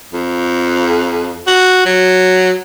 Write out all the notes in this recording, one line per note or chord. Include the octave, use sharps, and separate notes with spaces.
F2
F#4
F#3